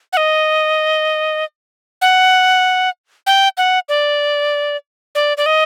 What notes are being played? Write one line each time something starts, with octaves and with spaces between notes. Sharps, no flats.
F#5
D#5
F#5
G5
F#5
D5
D5
D5
D#5